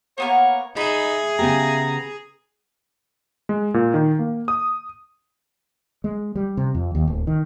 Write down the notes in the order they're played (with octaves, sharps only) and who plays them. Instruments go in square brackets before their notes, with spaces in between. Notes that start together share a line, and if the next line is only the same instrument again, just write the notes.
[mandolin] A#3 B3 A#4 [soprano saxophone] C#5
[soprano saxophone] D#4 [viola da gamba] G#4 [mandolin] E5 B5
[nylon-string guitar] C#3 B3 G4 [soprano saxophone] A#5
[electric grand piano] G#3
A#2
D#3
A#3
D#6
[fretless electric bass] G#3
G3
C3
F2
D#2
D1
D#3